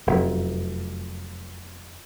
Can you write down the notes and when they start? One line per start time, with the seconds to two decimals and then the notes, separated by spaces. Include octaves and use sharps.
0.07 F1 F#2